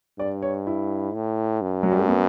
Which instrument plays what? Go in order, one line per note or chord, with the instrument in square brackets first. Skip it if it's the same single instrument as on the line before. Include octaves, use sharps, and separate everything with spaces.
[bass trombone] G2 [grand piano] D5
[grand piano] C#5
E4
[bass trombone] A2
F#2
[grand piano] F#3
G3
A3
B3